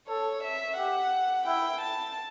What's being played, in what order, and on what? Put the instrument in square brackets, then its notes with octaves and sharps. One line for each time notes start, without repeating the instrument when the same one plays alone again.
[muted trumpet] A4 [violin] C#5
[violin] E5
[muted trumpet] G4 [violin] F#5
[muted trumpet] E4 [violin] G5
[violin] A5